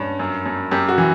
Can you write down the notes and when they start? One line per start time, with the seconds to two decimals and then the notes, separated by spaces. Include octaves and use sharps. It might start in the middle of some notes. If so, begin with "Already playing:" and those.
Already playing: G2 C#4
0.19 F#2
0.46 F#2
0.72 F#2 G4
0.89 F#4
0.98 E3